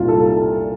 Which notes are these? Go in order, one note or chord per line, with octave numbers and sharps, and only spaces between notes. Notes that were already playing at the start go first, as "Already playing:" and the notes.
Already playing: C2 A#2 G3 F4
A4